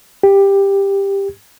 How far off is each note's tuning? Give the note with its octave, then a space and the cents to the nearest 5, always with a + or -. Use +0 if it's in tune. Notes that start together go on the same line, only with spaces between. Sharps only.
G4 +10